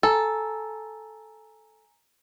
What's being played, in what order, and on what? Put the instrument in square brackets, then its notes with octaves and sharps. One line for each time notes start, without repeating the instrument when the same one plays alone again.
[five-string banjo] A4 [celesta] G#5 A#5 E6